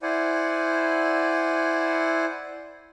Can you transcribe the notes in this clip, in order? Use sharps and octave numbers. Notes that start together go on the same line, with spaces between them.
E4 C5 D5 F#5 G#5